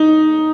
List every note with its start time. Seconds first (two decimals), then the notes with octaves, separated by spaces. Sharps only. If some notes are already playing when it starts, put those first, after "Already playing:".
Already playing: D#4